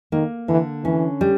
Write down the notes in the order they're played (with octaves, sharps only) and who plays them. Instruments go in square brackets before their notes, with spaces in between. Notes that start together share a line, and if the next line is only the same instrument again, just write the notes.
[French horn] D#3 [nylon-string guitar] A#3
[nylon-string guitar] D3 [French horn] E3
[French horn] E3 [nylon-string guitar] C#4
[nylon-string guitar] G3